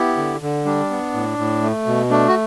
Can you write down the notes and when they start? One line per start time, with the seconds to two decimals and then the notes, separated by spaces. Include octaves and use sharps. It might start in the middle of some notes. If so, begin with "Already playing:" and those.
Already playing: B3 E4 G4
0.17 D3
0.42 D3
0.65 G3 D4
0.90 B3
1.14 A2
1.38 A2
1.62 A3
1.86 B2
2.10 A3 D4
2.28 F#4